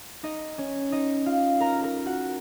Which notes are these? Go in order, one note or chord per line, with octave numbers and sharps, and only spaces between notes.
D#4 D#5
C#4 C#5
D#4 D#5
F4 F5
A#4 A#5
A#4 A#5
F#4 F#5